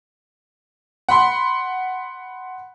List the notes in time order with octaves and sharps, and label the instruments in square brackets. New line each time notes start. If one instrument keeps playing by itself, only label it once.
[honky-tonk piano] F#5 B5 C6